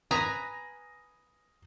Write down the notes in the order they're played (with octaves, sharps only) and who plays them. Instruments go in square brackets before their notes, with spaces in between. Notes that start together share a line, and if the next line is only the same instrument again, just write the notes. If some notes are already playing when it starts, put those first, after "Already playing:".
[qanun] B4 G#5 A#5 [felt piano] D#6 A#6